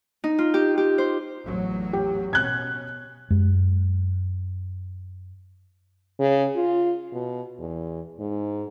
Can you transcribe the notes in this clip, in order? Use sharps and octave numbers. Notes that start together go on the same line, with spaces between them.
D#4
F4
G4
G4
C5
A1 E2 F#3
G4
B2 C#4 F#6 G#6
F#2 G#3
C#3
F4
B2
E2
G#2